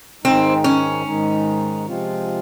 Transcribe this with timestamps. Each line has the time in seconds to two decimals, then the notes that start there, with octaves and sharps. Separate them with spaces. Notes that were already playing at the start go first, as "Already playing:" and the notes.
0.24 G#2 D#3 G#3 C4 D#4
0.64 C#4
1.05 G#2 D#3 G#3 D#4
1.86 C3 F3 G#3 C4 F4